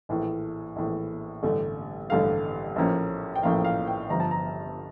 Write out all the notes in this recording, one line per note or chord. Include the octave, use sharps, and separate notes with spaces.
A#1 A2 E3
A#1 A2 E3
A1 G2 D3 A3
A1 G2 D3 A3 F5
A#1 A2 F3 A#3 C#4
G5
A#1 A2 F3 A#3 C#4 F5
F5
G5
G1 G2 F3 A#5
A5
A#5